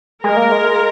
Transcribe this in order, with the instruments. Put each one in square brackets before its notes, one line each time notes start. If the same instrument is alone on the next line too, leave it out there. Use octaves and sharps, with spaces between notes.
[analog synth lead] G#3 [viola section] A#4
[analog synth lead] A#3
G#3